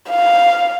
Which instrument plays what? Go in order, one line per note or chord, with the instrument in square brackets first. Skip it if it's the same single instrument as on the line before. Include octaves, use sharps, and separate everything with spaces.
[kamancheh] F5